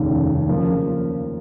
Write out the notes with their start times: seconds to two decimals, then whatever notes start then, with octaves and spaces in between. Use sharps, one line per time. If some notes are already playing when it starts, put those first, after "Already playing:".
Already playing: F1 D#2 C#3
0.48 C#3 F3 A#3 F4